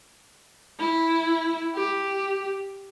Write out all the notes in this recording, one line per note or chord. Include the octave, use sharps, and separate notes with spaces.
E4
G4